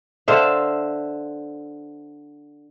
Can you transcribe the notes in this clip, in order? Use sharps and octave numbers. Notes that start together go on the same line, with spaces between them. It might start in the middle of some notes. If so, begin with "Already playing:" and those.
D3 C5 E5 F5